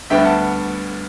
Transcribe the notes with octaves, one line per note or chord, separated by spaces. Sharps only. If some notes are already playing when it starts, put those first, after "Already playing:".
D2 D3 G3 B3 D4 E5 G5
F#5 A5